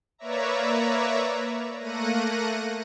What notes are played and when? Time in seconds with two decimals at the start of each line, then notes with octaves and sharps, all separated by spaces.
0.18 A#3 B4 C#5 D5 E5 A#5
1.80 A3 A#3 F#6 A#6 C#7 D#7